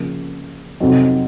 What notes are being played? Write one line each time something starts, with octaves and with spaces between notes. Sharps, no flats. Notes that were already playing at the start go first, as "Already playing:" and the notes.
Already playing: C#3 F3 A#3
F2 C3 F#3 C4 D#4